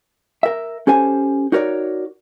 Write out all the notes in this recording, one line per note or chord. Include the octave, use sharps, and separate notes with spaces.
A#4 E5
C#4 G4 A4 C5 G#5
D#4 F#4 A#4 C#5 D5